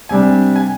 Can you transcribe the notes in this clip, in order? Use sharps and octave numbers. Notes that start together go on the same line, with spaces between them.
C3 G3 D4 G#5
G#5